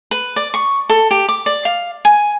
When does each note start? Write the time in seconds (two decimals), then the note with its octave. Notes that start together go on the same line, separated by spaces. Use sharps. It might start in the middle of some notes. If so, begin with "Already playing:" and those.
0.11 B4
0.36 D5
0.54 C#6
0.90 A4
1.11 G4
1.29 D6
1.46 D5
1.65 F5
2.05 G#5